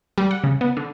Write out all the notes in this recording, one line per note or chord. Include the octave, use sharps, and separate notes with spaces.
G3
F#5
C#3
B3
D3